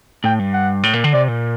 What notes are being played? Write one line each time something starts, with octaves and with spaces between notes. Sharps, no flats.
A2 G5
G2
F#5
A2
A#2
D3
C3 D5
A#2